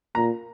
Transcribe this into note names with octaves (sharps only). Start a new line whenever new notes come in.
A#2 A#5